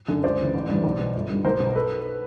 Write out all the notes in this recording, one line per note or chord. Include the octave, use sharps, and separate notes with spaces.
F#2 D3
C#2 C5 D5
C#3 E3
A1
G2 E3
B1
B2
G1
G2 D3
B1 A#4 C5
B2
A4 B4